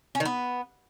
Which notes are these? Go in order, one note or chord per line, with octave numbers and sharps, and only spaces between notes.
C#4
D#3
B3